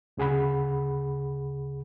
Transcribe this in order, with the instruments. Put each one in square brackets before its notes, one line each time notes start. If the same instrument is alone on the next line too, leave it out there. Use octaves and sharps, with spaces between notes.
[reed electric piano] D2 C#3 G#4 F#5 B5